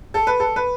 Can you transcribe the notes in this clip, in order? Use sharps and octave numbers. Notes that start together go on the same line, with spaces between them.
A4
B4
A4
B4